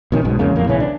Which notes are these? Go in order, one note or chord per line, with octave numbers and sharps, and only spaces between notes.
B2 D#3 C#4
B1 G#2 B2
E2 G#2 C#3 A#3
F2 A2 A#3
B1 C#3 E3 C#4
D4